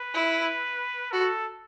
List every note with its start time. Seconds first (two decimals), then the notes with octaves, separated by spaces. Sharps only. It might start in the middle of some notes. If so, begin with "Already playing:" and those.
Already playing: B4
0.14 E4
1.12 F#4 A4